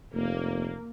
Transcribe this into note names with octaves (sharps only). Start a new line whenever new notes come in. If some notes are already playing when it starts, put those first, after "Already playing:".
F1 A#3